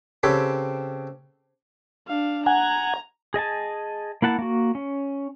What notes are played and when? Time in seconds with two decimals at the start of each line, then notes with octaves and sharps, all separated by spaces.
0.23 C#3 C4 G4 A4 B4 C#5
2.08 D4 F5
2.46 F#5 G#5 A#5
3.34 G#4 D#5 G#5 A5
4.22 A#3 E4 F#5 A5
4.39 A#3 F#4
4.75 C#4